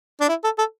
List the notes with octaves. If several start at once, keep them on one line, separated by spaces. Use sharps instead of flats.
D4
E4
A4
A4